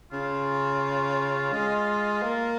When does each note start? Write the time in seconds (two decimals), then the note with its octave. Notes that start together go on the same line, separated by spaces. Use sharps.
0.12 C#3 F4
1.53 G#3
2.23 A#3